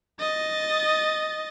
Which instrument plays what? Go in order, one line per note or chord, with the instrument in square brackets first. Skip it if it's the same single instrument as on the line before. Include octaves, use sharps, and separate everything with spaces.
[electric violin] D#5 A6